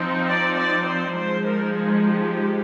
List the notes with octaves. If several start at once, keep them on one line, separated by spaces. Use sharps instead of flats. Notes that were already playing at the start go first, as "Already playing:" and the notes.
Already playing: F3 C4 D#4
D5
D5
C5
F3 G#3 D#4 C5
A#4
G#4
G4